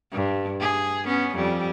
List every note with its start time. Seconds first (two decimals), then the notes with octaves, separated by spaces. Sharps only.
0.12 G2
0.60 G#4
1.05 B3 C#4
1.35 F2 G3